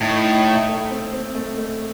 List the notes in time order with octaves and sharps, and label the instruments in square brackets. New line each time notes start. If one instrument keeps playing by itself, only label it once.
[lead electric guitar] A2 [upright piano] D#4
[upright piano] D#4
D#4
A3
C4
C4
A3
A3